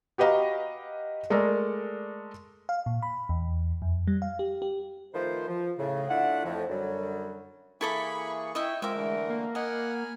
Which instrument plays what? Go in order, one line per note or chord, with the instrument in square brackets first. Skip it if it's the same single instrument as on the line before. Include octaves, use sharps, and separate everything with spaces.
[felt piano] F#4 G4 B4 D#5 F5 A#5
G#3 A3 A4 A#4 D5
[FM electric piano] F5
A#2
B5
E2
F2
G3
F5
G4
G4
[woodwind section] D#3 F3 A3 B4 C5
F3
A2 C#3
A3 D4 E4 F4 F#5
F2 A2 F3
F#2 D3 F#3 G3
[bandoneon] E3 A#3 G#4 [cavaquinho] E4 A4 D6 [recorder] B5 [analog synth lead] C#6
[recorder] E4 [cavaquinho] D#5 E5 G5
[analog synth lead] G#3 [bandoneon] C4 F4 [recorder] A#4 [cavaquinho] E5 D6
[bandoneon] D3 E3 A3
[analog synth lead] A#3
[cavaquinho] D#5 [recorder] F#5 [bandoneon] G#5 B5 F6